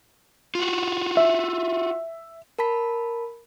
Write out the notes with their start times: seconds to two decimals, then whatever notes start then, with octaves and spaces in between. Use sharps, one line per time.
0.55 F4 F#4
1.17 E5
2.59 A#4 A5 B5 B6